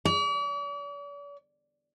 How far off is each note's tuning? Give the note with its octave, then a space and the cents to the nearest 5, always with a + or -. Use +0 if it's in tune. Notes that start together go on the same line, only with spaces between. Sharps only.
D5 -45